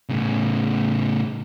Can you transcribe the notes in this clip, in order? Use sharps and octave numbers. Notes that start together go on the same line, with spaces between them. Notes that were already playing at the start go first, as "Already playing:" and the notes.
A2 C#3